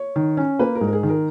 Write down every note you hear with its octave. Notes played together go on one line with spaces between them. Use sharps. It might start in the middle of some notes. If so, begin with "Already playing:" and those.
Already playing: C#5
D#3
C#4
A#3 B4
A#4
G#2
A#4
G#4
D#3
A#4